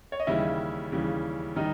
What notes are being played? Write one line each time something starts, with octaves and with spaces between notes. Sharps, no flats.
C#5
D#5
D#2 C#3 E3 G3 E4 E5
D#2 C#3 E3 G3
D#3 G3 D#4 D#5